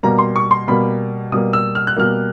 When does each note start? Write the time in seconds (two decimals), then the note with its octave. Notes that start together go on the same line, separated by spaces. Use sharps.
0.03 B2 G3 A#3 A#5
0.18 C6
0.36 C#6
0.51 C6
0.68 B2 G3 A#3 B5
1.32 B2 G3 A#3 D#6
1.53 E6
1.75 F6
1.87 F#6
1.97 B2 G3 A#3 F6